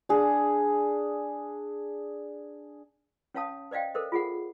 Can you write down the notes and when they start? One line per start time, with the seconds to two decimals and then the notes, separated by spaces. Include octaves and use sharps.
0.09 D4 G#4
3.35 C#4 C#5 F5 A5 D#6
3.71 C5 D5 D#5 F5 G5
3.94 A4 A#4 C5 D#5
4.12 F4 G#4 F#5